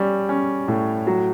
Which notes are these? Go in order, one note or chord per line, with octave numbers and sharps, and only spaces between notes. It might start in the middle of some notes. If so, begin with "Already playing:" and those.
Already playing: G3 C#4
C#4
A2
F#3